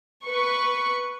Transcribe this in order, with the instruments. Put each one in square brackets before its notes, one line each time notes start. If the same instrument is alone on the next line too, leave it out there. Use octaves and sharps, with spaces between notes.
[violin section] B4 C#6